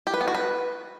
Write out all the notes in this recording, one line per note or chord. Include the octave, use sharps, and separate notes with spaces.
G4
B4
B3
F#4
B4